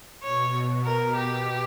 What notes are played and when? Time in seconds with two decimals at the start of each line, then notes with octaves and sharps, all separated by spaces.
0.24 B2 C#5
0.85 A#4
1.16 G4